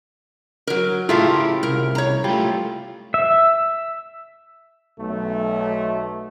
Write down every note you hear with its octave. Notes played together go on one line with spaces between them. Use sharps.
F#3 A#4
A2 C#3 F4 G4 A4 A#4 E5 F5
C2 A#4
C#5 A#5
G3 A3 F4
E5
B1 A3